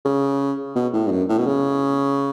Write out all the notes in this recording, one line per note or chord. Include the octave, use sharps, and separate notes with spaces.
C#3
B2
A2
G2
F#2
A2
B2
C#3